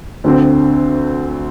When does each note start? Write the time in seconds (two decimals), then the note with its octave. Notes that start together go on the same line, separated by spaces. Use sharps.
0.24 D2 D3 C4